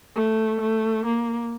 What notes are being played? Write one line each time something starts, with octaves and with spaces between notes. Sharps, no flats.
A3
A3
A#3